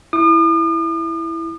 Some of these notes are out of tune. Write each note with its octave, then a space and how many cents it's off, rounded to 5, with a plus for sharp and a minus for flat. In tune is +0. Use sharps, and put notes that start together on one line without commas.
E4 +0 D#6 -45